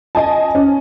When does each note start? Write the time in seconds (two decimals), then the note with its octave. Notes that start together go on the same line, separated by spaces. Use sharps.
0.15 D#5 G#5 A5
0.55 C#4